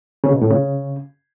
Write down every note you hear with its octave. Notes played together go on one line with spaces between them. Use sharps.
C#3
B2
A2
C#3